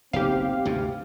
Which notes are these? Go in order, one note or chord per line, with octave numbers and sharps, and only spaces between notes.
F#1 B1 C4 G4 F5
D2 G2 C3